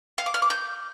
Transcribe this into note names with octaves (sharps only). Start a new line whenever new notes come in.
F5
D6
F6
D6
G6